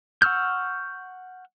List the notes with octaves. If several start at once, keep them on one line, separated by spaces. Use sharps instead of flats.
F#5 C#6 E6 F6 G6